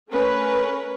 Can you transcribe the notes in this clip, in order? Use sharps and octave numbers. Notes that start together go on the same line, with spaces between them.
A3 C#4 A#4 B4